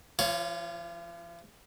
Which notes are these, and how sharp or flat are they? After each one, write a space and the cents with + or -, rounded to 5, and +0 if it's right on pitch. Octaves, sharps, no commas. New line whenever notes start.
F3 -45 F4 +0 C#5 -5